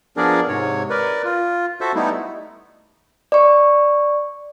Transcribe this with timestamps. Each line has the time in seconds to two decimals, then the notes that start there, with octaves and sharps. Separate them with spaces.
0.17 F3 B3 D4 G#4 A#4 D5
0.48 G#2 C3 C#5
0.90 A#4 B4 D5
1.24 F4
1.81 F#4 A4 C5 E5
1.95 G3 A3 B3 D#4 E4
3.32 D5 C#6